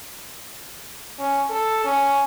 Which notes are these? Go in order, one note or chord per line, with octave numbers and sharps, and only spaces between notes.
C#4
A4
C#4